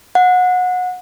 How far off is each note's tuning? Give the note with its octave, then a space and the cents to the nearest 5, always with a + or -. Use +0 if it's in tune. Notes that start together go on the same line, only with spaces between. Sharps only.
F#5 -25